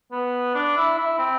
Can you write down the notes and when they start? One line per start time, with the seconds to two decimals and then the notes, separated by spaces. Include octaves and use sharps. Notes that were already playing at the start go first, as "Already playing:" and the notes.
0.12 B3
0.55 D4
0.77 E4
0.98 E4
1.19 C4